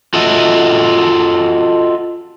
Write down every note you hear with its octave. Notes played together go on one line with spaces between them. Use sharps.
F4 F#4 A4 D#5 E5